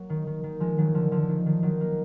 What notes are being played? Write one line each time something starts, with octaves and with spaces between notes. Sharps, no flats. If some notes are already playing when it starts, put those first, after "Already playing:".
Already playing: F#3 A#3
D#3
D#3
D#3
F3 G#3
D#3 F#3
D3 F3
D3 F3
D3
D#3
D#3
D#3 F#3
F#3 A#3